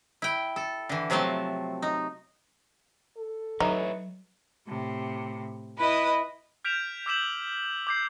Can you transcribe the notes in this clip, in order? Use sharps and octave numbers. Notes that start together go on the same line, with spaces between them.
E4 G5
A4
D3 E3
C3 F3 F#3 A3 C4 A5
D#4
A4
F#3 D#4 B4 C#5 E5
A2 C3
E4 B4 D#5
F6 G6 B6 D7 E7 F7
D6 E6 G6 B6 E7 F#7
D6 G6 C7